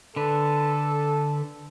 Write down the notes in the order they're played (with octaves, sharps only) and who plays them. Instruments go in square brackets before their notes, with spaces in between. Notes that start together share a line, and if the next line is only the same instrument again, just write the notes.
[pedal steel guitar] D3 B4 [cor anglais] A4